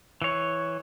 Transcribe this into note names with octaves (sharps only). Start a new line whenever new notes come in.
E3 C#5